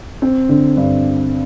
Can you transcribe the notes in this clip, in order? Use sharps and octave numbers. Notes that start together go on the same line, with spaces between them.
C4
D3
G2